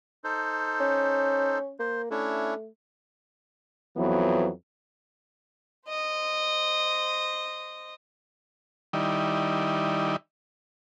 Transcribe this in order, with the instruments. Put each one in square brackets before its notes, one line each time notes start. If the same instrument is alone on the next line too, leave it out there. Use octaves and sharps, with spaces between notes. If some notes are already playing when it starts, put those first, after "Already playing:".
[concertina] D#4 A4 C5
[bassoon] C#4
[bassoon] A#3 [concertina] C5
[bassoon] A3 [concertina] C#4 D4 E4
[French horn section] F2 E3 F#3 B3
[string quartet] C5 D#5
[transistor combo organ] D#3 G3 D#4 E4 D5